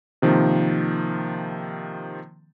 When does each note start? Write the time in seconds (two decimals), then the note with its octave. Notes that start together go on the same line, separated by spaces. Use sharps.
0.22 C3 D#3 F3 A#3